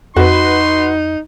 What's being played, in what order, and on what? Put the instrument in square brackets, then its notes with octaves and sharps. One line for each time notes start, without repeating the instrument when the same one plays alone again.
[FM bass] F2 [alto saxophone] D#4 [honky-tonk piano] F#4 B4 [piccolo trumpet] C6